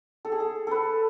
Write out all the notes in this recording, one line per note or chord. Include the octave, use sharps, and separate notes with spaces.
A4
G#4
A4
A4 B4